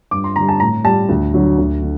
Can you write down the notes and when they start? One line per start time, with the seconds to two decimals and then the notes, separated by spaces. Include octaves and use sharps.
0.11 G2 D6
0.24 C6
0.36 D3 G3 A#5
0.48 A5
0.60 A2 A#5
0.84 G3 A5
1.09 D2
1.34 D3 F#3
1.58 D2
1.82 D3